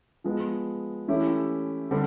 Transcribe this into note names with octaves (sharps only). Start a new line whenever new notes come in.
F3 G#3 B3
E3 A3 C#4 E4 G4
D3 G3 C4